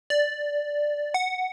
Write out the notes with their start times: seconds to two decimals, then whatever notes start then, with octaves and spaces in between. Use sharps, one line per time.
0.10 D5
1.14 F#5